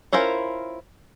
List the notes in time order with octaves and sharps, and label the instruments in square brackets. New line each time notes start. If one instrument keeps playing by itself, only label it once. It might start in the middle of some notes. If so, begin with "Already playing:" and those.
[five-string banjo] C#4 E4 F4 A#4 C5